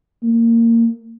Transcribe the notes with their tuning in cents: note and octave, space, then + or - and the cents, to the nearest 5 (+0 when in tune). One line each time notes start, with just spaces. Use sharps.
A#3 -20